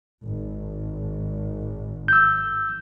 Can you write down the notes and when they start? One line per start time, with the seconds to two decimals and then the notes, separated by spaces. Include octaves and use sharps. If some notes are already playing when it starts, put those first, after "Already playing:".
0.25 G#1
2.08 E6 G6